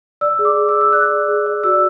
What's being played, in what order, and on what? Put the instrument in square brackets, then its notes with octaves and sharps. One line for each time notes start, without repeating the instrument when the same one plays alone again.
[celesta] D5 E6
G#4
D6
G#4
E6
D5
E6
D5 F#6
G#4
G#4
D5
F#4 E6